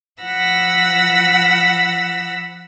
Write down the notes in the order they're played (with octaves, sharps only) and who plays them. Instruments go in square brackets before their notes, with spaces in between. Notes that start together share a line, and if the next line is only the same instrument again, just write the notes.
[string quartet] F3 F#5 B5 E6 A#6